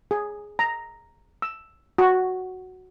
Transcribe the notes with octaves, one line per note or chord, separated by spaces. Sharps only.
G#4
A#5
E6
F#4